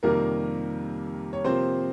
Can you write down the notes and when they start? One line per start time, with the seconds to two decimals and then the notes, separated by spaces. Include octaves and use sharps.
0.03 F2 C3 D#3 G3 A#3 A#4
1.33 C#5
1.44 C3 F3 A#3 C4 C5